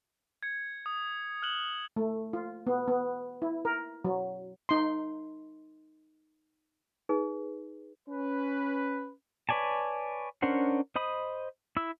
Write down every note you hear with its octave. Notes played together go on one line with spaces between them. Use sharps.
G#6 C#7
D#6
F6 F#6 E7 F#7 G7
A3
F4
B3
B3
E4
A#4
F#3
D#4 C6
D#4 G#4 B4
C#4 B4
B4 C#5 D5 G#5 A5
C#4 D4 A#4 C5 F#5
C5 D#5 B5 D#6
E4 E6